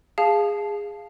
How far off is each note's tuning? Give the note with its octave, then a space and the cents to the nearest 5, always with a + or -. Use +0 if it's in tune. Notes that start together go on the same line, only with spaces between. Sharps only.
G#4 -15 F5 +0 A5 -20